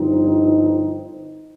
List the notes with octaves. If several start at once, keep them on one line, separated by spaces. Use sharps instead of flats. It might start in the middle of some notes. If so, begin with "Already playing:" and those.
Already playing: G1 G2 F3 C4 D#4